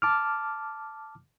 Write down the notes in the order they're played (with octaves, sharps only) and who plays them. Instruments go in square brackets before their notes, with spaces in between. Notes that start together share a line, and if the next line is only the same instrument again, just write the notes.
[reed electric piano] A5 D6 F6